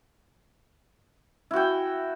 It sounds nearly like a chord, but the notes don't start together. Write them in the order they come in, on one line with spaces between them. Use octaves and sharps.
E4 F#4 G5